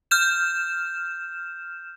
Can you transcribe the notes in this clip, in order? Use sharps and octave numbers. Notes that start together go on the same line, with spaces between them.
F6 G6 E7